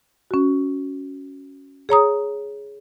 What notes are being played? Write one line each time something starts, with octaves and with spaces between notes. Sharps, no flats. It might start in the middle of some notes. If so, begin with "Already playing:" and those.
C#4 F#4
G#4 C#5 A#5 D#6